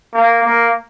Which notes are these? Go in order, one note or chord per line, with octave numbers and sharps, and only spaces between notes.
A#3
A#3